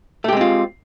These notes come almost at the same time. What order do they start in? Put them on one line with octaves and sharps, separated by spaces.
A3 G4 G#3 C4 F4